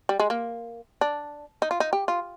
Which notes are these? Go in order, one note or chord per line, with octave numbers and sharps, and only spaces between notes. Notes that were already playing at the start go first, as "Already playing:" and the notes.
G3
G#3
A#3
D4
D#4
F4
D#4
G4
F4